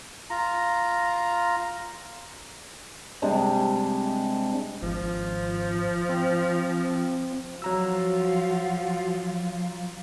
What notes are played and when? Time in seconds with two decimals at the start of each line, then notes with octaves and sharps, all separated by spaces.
0.30 F4 A#5
3.22 C3 G3 G#3 D4
4.82 G#1 F3
6.09 C4
7.62 F3 F#3 F4 F#4 A#5 E6